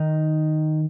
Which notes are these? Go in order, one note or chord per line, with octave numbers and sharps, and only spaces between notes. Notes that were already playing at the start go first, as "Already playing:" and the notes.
Already playing: D#3 D#4